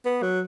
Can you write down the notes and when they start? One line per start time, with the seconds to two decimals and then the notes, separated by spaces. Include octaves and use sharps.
0.05 B3
0.22 F#3